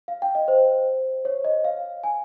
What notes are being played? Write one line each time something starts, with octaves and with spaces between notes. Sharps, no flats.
F5
G5
D#5
C5
C#5
D#5
F5
G#5